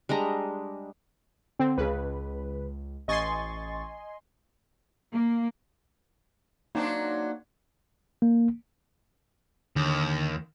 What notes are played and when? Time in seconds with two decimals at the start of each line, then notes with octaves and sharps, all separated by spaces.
0.09 G3 G#3 D4 A#5
1.59 D3 C4
1.78 C#2 C#3 B4
3.08 A1 D#5 G#5 C6 C#6 A6
5.11 A#3
6.75 F#3 A#3 C4 D4 D#4
8.22 A#3
9.76 D#2 D3